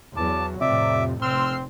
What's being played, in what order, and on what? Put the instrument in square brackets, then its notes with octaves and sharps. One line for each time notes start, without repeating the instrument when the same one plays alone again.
[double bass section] E2 F#3 [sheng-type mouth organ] A5 [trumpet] D6
[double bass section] F2 A2 [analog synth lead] C3 [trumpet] D5 [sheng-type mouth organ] E5 D6
[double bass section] F1 [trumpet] C4 [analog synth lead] C6 [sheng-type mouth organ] E6 F6